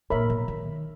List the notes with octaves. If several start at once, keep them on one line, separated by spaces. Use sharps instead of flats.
A#2 A#4 C#5 E5 B5
B2
D#3